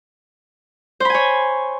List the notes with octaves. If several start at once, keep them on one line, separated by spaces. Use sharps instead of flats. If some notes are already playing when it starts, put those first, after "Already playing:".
C5 C#5 G#5 B5